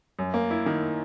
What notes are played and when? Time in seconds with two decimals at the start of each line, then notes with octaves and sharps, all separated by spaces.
0.19 F#2
0.34 A#3
0.51 E4
0.66 D#3